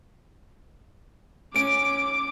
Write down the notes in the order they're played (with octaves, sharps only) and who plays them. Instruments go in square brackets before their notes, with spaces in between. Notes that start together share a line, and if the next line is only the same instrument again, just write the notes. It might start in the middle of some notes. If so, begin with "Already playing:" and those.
[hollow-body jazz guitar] C#4 [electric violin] D6 [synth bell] D7